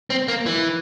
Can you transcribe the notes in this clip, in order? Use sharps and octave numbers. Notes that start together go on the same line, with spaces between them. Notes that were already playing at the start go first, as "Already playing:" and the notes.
C4
A#3
E3